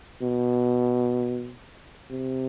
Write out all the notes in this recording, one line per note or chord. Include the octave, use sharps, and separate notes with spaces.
B2
C3